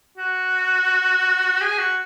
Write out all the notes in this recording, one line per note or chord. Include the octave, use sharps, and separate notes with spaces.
F#4
G#4
F#4